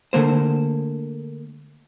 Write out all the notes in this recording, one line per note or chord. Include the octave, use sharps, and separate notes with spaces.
D3 A3 A#3 C5